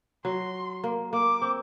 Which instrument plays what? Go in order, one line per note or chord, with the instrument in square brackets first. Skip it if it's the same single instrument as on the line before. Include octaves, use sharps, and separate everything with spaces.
[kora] F#3 [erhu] C6
[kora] A#3
[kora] A#3 [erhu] D6
[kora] C4